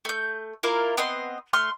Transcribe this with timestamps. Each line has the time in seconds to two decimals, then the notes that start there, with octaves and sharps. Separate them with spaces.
0.05 A3 G6
0.63 A#3 E4 F4 A#4
0.97 B3 C4 D#5 C6
1.53 A3 C6 F6